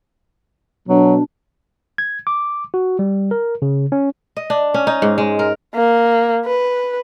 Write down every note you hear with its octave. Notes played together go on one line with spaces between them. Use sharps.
B2 F#3 D4
G#6
D6
F#4
G3
A#4
C#3
C#4
D#5
D4
C#4
D#4
G#2
G#3
A#4
A#3
B4